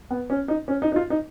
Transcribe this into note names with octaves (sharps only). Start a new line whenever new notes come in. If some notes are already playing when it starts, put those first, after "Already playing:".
B3
C#4
D#4
C#4
D#4
D#4
F4
D#4